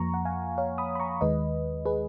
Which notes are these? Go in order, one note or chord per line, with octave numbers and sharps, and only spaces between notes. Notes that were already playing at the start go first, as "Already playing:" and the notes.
Already playing: F2 F3 A#3 A#5 C#6
F#5
F5 G#5
C#5 F5
B5 D#6
B5
A#5 C#6
D#2 D#3 G#3 B4 D#5
G#4 B4